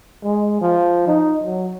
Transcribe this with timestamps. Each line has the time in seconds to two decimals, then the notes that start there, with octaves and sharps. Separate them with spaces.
0.23 G#3
0.61 F3
1.07 D#4
1.43 F#3